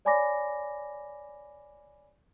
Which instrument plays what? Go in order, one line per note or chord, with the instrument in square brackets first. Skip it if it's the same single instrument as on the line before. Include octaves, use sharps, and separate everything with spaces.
[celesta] C#5 D5 G#5 B5 D6 A#6